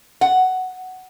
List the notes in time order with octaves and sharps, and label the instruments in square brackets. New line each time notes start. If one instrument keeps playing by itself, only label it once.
[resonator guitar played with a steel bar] F#5